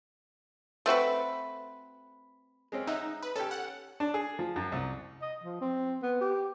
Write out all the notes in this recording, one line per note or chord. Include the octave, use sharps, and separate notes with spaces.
A3 C4 F#4 B4
G#3 C4 C#4
D#4 E5 F#5
B4
C#4 G4 A4
F#5
D4
G#4
F3
F#2
C2
D#5
F3
C4
B3
G4